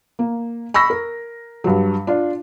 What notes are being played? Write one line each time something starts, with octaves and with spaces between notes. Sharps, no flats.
A#3
B5 C#6 E6 A#6
A#4
G2 F#3
D4 F4